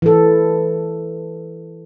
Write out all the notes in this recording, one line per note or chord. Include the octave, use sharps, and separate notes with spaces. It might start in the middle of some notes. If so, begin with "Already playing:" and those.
E3 A4